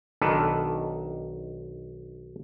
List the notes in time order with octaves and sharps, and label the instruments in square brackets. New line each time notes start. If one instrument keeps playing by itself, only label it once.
[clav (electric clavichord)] B1 D#3 D4 A4 B4